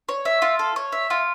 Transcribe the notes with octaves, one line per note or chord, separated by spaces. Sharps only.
C#5
E5
F4
A4
C#5
E5
F4